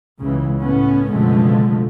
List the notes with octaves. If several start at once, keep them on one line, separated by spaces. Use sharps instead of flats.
C#2 C#3 E3
A2 B3 C#4
F#1 B2 D3 F3 G#3 A3